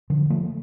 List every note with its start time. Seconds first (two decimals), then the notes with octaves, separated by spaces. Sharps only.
0.10 D3 F3
0.30 F3 A3